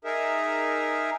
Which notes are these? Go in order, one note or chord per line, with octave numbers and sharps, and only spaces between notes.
D#4 G#4 A#4 E5